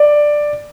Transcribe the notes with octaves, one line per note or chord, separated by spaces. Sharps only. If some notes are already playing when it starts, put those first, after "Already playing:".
Already playing: D5